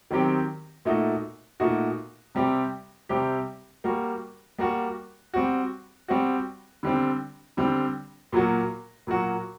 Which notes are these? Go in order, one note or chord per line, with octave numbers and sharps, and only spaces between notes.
D#3 F#3 C4 G4
A#2 A3 D#4 F#4
A#2 A3 D#4 F#4
C3 G3 C4 G4
C3 G3 C4 G4
G3 A#3 F#4
G3 A#3 F#4
G3 C4 F#4
G3 C4 F#4
D3 G3 C4
D3 G3 C4
A#2 F#3 A#3 F#4
A#2 F#3 A#3 F#4